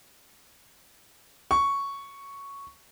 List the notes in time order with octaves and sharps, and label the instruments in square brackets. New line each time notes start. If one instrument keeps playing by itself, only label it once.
[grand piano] C#6